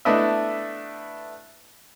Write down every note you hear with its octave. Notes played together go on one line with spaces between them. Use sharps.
A3 B3 D4 E4 D#5 E5